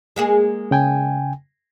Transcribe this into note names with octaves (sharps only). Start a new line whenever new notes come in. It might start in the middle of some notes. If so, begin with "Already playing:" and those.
G#3 A#3 G#4
C#3 G5 G#5